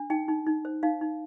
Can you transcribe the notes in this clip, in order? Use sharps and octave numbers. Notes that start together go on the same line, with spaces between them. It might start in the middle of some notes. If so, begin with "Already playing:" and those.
Already playing: D4
D#4 G5
D#4
D#4
C5
D#4 F5
D#4